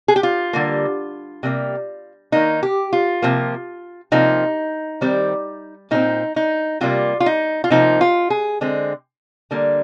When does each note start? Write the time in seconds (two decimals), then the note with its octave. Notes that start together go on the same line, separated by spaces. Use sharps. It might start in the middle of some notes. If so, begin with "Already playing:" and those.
0.08 G#4
0.16 G4
0.23 F4
0.53 D3 G3 A#3
1.43 C3 G3 A#3
2.32 D#3 A#3 D#4
2.63 G4
2.93 F4
3.22 C3 F3 A#3
4.12 C3 F3 A#3 D#4
5.01 D#3 G3 C4
5.91 A#2 G3 C4 D#4
6.36 D#4
6.81 C3 G3 A#3 F4
7.20 F4
7.26 D#4
7.64 F4
7.70 C3 F3 A#3 D#4
8.01 F4
8.30 G#4
8.61 D3 G#3 C4
9.51 D3 G3 A#3